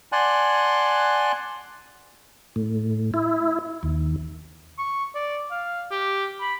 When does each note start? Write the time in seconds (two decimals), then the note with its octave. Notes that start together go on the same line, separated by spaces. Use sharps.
0.12 D5 F#5 G#5 A5 C6 F#6
2.56 A2
3.14 E4
3.83 D#2
4.79 C#6
5.15 D5
5.51 F5
5.91 G4
6.40 B5